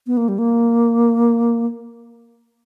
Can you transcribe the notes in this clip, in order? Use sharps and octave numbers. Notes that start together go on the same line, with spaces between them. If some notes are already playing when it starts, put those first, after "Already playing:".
B3
A#3
G3
A#3